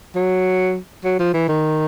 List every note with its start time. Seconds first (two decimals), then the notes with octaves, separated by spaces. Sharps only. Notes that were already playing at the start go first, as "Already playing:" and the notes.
0.16 F#3
1.05 F#3
1.19 F3
1.34 E3
1.48 D#3